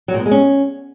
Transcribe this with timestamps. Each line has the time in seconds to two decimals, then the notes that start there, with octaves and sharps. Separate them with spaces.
0.08 F#3
0.14 A#2
0.20 B3
0.26 G#3
0.31 C#4